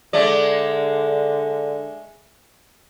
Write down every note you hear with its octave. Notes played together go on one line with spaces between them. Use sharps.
D3 G#3 A3 D5